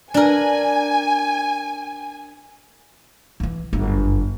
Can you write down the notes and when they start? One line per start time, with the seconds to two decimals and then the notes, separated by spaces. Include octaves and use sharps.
0.14 D4 A#4 G#5
3.40 D#3 E3
3.73 G1 F#2